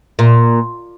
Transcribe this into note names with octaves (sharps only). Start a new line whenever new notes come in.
A#2